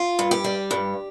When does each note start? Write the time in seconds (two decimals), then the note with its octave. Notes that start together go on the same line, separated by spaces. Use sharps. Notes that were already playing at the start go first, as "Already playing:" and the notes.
Already playing: F4
0.19 G2
0.31 G4
0.44 G3
0.71 G2